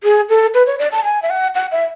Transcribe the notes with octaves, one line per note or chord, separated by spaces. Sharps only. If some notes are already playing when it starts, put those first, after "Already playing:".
G#4
A4
B4
C#5
D5
A5
G#5
E5
F#5
F#5
E5